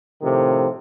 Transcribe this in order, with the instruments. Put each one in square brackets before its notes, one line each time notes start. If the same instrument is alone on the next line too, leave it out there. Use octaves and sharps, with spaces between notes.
[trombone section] A2 C3 D#3 F3